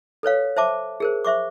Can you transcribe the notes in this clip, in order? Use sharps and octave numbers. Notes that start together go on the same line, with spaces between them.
A4 B4 C#5 F5
C5 E5 A5 D6
G#4 A#4 C5
C5 E5 C#6 D6